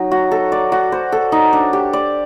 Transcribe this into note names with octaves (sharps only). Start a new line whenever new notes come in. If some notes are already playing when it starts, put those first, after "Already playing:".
Already playing: F#3 D#4 D#5
F#4
A4
D5
F#4
C5
A4
D#4
D4
G4
D5